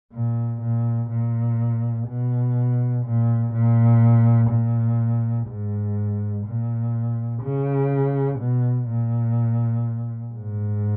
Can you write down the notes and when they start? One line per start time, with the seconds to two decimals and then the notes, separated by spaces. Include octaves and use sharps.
0.13 A#2
0.62 A#2
1.10 A#2
2.08 B2
3.05 A#2
3.53 A#2
4.50 A#2
5.48 G#2
6.45 A#2
7.42 C#3
8.39 B2
8.88 A#2
10.33 G#2